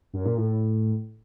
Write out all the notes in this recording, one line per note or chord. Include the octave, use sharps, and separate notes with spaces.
F#2
A#2
A2